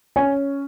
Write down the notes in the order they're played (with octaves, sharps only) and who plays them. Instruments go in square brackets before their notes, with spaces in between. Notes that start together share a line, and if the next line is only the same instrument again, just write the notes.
[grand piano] C#4 [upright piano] G#5